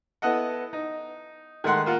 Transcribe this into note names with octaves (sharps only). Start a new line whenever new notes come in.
B3 E4 A4 D#5 F#5
D#4
D#3 G#3 A3 F#5 C6
A#3 F4 F#5